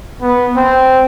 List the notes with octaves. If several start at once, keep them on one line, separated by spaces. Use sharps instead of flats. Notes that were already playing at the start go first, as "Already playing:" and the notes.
B3
C4